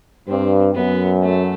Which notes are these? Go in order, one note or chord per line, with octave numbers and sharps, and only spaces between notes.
G2 C4
F#2 B3
A3